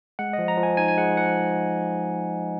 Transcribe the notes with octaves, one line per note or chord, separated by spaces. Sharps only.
G#3 F#5
D#5
F3
A#5
F3
G#5
D#4 G#5
G#5
G#3 F#5
F3 F#5